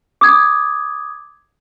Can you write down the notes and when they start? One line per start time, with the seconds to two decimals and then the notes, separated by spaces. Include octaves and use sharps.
0.21 D6 D#6 G#6